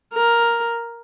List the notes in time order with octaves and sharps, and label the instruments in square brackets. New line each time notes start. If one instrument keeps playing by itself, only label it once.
[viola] A#4